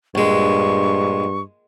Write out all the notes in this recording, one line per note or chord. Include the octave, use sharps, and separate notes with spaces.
A#1 G2 G#3 C#6